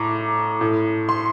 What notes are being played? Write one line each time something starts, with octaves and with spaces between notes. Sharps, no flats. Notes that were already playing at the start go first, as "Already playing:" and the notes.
Already playing: A2 A#5 D6
A2
C6